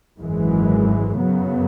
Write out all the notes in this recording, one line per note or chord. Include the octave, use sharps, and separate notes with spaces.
G#1 F#2 E3 G#3
F#2 C#3 F#3 B3